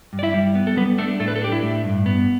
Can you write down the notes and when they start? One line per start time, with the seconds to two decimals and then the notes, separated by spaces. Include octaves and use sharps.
0.13 G2
0.19 D5
0.23 E4 E5
0.34 G3
0.55 B3
0.67 A4
0.77 G3 B3 B4
0.98 A3 D4 A4
1.19 A2 A3 A4
1.28 B4
1.36 A4
1.42 D4 G4
1.52 E4
1.63 A2
1.84 G2
2.06 B3